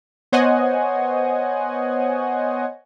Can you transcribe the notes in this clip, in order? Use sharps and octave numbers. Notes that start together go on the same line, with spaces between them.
B3 C5 C#5 D#5 F#5 G#5